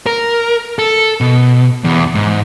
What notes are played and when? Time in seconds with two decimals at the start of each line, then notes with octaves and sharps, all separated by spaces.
0.06 A#4
0.79 A4
1.21 B2
1.84 E2
2.15 G#2